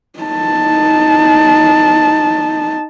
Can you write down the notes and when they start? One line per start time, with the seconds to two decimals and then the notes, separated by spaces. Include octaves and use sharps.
0.19 D#4 A5